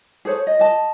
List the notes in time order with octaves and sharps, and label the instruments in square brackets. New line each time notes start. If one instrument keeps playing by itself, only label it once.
[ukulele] G#4 A4 C5 C#5
D#5
D#5 A5